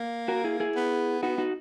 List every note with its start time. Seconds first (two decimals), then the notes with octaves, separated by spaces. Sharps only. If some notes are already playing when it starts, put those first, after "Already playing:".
Already playing: A#3
0.28 F#4 A#4
0.44 E4 G#4
0.60 E4 G#4
0.76 B3
1.23 B3 D#4 F#4
1.38 D#4 F#4